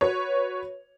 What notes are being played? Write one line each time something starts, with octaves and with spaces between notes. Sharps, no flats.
F#4 B4 C#5